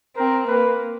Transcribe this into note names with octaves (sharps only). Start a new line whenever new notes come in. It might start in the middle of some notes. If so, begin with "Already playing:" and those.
C4 A#4
A#3 B4